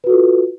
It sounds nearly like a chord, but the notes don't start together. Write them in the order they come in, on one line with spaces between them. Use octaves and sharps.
B4 F#4 A4 F4